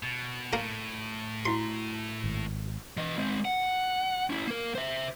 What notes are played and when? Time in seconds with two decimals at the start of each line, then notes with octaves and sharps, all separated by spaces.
0.03 B2
0.53 A2 A#3 A#4
1.45 E4 F#4 C6
2.24 G#1
2.97 E3 D#5
3.18 G#3 C4
3.45 F#5
4.30 C#4 E4
4.47 A#3 A#4
4.75 C5 E5